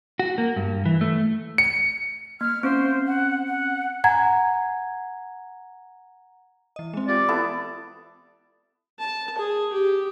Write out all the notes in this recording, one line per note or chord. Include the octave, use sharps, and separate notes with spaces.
F#4
A#3
G2
E3
A3
C#7
A#3 F6
C4 C#4 C5
F#5
F#5
F#5 G#5 A#5 G#6
E3 D#5
G#3 C4
F4 G4 D5
B3 E4 A4
A5
G#4
G4